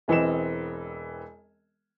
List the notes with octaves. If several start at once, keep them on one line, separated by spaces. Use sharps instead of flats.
E1 E3 C4 D#5 E7